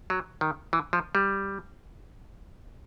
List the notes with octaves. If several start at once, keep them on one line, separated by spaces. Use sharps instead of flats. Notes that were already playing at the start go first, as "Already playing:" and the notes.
F#3
D#3
E3
F3
G3